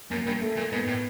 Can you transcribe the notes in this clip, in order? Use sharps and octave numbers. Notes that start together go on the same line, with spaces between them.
F#2 A#3
G2 A#3
A3
A#2 A#3
G#2 B3
A2